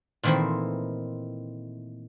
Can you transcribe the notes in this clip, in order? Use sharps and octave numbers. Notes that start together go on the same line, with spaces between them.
A#2 D#3 E3 A3 C4 E4